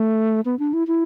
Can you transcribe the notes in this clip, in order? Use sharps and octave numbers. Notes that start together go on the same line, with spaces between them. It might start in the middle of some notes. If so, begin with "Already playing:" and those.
Already playing: A3
B3
D4
E4
E4